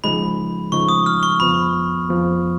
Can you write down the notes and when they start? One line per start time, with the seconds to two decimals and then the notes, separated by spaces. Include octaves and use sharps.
0.04 C#3 F3 G#3 D#4 B5
0.72 C#3 F3 G#3 D#4 C#6
0.89 D#6
1.06 F6
1.23 C#6
1.40 F2 F3 B3 B5
2.09 F2 F3 B3